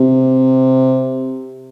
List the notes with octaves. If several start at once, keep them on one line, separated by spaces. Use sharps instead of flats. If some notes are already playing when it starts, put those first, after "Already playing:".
Already playing: C3